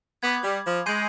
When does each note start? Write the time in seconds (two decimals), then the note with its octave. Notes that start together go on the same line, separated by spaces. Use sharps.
0.23 B3 B5 D6 G#6
0.43 G3
0.65 F3
0.86 G#3 G#5 C6 G6 C7 D#7